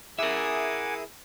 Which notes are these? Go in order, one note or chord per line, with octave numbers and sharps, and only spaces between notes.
E4 G#4 A#4 E5 F#5 G#5 D6 D#6